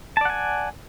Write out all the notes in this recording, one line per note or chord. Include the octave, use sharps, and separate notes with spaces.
D5 F#5 G#5 A5